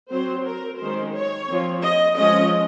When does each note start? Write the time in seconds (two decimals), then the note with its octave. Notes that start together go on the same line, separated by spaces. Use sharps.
0.10 F#3 C4 C5
0.45 A#4
0.79 D#3 G#3 C#4 C5
1.14 C#5
1.48 F3 C4
1.83 D#5
2.17 F3 G#3 C#4 D#5